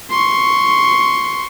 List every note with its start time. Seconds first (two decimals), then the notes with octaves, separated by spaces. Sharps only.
0.11 C6 C#6